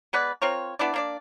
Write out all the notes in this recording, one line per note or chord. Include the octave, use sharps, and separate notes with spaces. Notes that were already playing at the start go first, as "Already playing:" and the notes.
G#3 B3 B4 D5
C4 F4 A#4 C#5
B3 D4 E4 D5
A#3 D4 D5